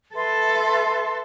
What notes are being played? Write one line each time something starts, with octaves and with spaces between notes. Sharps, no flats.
A4 B4 E5 C6